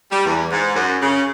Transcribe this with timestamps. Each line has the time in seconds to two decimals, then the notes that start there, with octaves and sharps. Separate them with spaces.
0.11 G3
0.26 E2
0.52 G#2
0.75 F#2
1.01 C#3